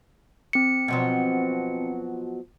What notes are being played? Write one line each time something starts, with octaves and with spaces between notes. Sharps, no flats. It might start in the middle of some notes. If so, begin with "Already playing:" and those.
C4 C#7
B2 F3 F#3